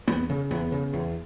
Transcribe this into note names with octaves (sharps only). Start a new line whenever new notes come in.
E2 B3
C#3
E2 B3
C#3
E2